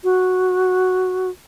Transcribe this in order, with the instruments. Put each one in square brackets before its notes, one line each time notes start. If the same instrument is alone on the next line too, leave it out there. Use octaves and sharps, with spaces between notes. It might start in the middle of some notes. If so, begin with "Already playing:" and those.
[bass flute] F#4